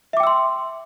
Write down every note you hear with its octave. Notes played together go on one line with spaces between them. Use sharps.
E5 G5 C6 D6 E6